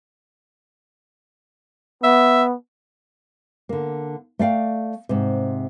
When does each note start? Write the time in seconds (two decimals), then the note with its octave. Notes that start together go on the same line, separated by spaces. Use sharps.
2.03 B3 E5
3.69 D3 A#3
4.39 A3 D5 F5 G5
5.09 G#2 C3